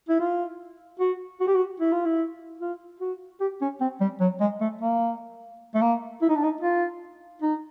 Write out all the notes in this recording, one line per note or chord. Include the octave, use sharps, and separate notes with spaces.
E4
F4
F#4
F#4
G4
F#4
E4
F4
E4
F4
F#4
G4
C#4
C4
G3
F#3
G#3
A3
A#3
A3
A#3
E4
D#4
D4
D#4
F4
D#4